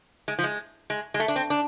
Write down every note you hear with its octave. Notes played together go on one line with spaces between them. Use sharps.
G#3
F3
G#3
G#3
G#3
A3
D4
C4
D4